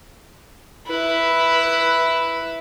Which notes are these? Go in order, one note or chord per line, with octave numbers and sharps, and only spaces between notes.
E4 B4